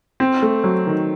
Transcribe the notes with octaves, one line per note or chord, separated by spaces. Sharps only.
C4
A3
F#3
D#3